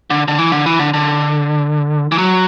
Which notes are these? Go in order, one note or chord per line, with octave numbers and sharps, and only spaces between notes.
D3
D3
E3
D3
E3
D3
D3
E3
F#3